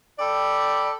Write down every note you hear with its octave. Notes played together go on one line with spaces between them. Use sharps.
A4 D5 G5 B5